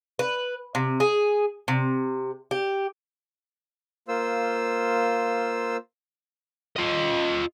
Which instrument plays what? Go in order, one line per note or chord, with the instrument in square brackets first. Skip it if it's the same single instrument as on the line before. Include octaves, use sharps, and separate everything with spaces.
[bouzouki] B4
C3
G#4
C3
G4
[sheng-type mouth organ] A#3 F4 C5 E6
[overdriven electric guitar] F4 D#5